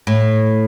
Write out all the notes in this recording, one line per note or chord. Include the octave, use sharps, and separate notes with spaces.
A2